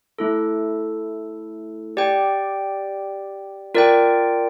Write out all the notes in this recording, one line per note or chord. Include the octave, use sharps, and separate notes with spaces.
A3 E4 A4
G4 D5 G5
F4 A#4 D5 G5